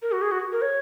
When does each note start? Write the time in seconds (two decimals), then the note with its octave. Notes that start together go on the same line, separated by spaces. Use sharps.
0.02 A#4
0.12 F#4
0.22 G#4
0.31 F#4
0.52 A#4
0.62 C#5